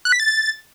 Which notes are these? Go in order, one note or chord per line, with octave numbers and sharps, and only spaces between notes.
F#6
B6
A6